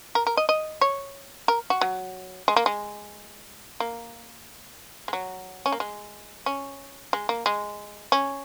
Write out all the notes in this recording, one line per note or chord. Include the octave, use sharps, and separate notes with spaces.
A#4
A#4
D#5
D#5
C#5
A#4
F#4
F#3
G#3
A#3
G#3
A#3
G#3
F#3
C#4
A#3
G#3
C#4
G#3
A#3
G#3
C#4